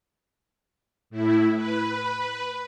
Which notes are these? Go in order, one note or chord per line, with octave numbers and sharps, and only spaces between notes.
A2 E4
B4